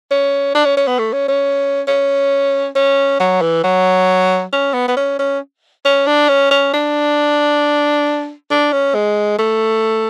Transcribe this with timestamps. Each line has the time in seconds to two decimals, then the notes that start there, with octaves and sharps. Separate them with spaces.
0.11 C#4
0.55 D4
0.65 C#4
0.77 C#4
0.87 B3
0.99 A3
1.13 C#4
1.28 C#4
1.87 C#4
2.75 C#4
3.20 F#3
3.42 E3
3.64 F#3
4.52 C#4
4.74 B3
4.88 B3
4.97 C#4
5.19 C#4
5.85 C#4
6.07 D4
6.29 C#4
6.51 C#4
6.73 D4
8.50 D4
8.72 C#4
8.94 G#3
9.38 A3